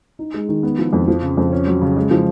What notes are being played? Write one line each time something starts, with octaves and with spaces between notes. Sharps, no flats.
D#4
G#3
D#3
B3
F3
F2
F3
C#3
F2
C#4
F#3
C#3
G#3
F3